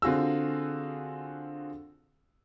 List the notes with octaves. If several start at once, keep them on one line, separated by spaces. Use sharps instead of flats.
D3 C4 F4 F#4 G#4 E6